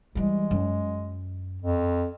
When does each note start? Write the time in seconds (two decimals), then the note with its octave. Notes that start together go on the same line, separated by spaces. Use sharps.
0.15 E3 G3 G#3
0.51 F#2
1.62 F2